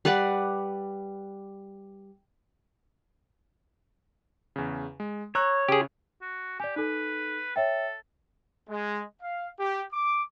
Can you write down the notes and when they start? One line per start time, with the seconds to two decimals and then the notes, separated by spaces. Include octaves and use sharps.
0.05 G3 B4 D5 F#5
4.56 E2 C#3
5.00 G#3
5.35 C#5 A#5 E6 F#6
5.68 C#3 G4 G#4
6.21 F#4
6.60 G4 D5 G#5
6.76 D#4 A4 B4
7.56 A4 C#5 E5 G5
8.69 G#3
9.22 F5
9.59 G4
9.93 D6